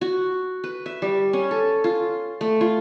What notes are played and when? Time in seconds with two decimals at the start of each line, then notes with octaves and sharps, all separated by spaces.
0.01 F#4
0.64 B4
0.86 E5
1.02 G3
1.33 C#4
1.51 A4
1.84 F4
2.41 A3
2.61 F4